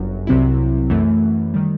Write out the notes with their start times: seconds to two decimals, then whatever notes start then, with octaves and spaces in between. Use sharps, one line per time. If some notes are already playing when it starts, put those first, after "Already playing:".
Already playing: G1 F#2 F#3
0.27 C2 C3 F#3 C4 E4
0.90 F#2 E3 A3
1.54 D#3 G3